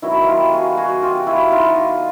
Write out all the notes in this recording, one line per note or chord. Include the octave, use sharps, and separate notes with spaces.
D#3 F#3 B3 E4 F#4
F4 G4
F#4 G#4
F#4 G#4
F4 G4
E4 F#4
D#4 F4